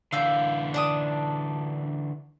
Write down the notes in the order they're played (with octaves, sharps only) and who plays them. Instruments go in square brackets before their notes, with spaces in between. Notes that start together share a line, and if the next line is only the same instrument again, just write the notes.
[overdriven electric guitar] D3 E3 [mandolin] F5 E6 G6
[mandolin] D4 A5 D#6